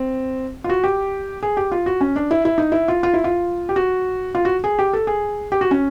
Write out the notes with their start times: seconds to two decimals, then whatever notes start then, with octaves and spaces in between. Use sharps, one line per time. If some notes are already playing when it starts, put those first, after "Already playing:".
Already playing: C4
0.64 F4
0.69 F#4
0.84 G4
1.43 G#4
1.57 G4
1.72 F4
1.86 F#4
2.01 C#4
2.16 D4
2.31 E4
2.45 E4
2.58 D#4
2.72 E4
2.88 F4
3.03 F4
3.14 E4
3.24 F4
3.69 G4
3.76 F#4
4.35 F4
4.45 F#4
4.64 G#4
4.79 G4
4.93 A4
5.07 G#4
5.52 G4
5.61 F#4
5.71 C#4